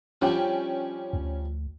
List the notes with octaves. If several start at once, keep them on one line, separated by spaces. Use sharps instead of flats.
F3 G3 C#4 D4 G5
D2